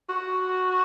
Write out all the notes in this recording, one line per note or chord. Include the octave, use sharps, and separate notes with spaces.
F#4